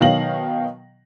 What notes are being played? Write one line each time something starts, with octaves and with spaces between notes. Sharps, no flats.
B2 D#3 F#3 F5 A#6 F#7